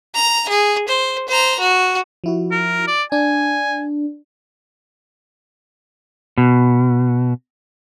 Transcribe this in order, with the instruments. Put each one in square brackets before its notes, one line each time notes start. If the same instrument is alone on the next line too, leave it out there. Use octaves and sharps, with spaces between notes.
[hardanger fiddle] A#5
G#4
C5
C5 A#5
F#4
[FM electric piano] F3 E4 F#4
[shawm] A#4
D5
[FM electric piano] D4 [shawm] G#5
[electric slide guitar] B2